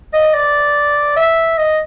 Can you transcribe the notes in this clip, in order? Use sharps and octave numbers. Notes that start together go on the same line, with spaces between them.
D#5
D5
E5
D#5